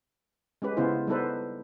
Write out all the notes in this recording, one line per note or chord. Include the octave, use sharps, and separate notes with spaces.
G#3 C#4 G4 B4
C#3 B3 E4 F4 C5
G3 B3 D#4 A4 B4 C5